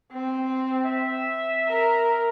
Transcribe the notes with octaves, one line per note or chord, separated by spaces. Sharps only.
C4
E5
A#4